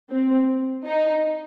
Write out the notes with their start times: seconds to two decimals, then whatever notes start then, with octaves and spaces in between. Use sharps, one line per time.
0.11 C4
0.86 D#4